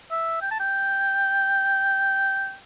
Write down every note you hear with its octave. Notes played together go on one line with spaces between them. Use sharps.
E5
G5
A5
G5